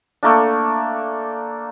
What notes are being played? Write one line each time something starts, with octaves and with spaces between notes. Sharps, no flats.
A3 A#3 D4